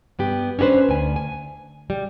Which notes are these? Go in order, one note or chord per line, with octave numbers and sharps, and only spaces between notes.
G2 B3 G4
C#4 D4 F#4 B4 C5
D2 G#5
G#5
G3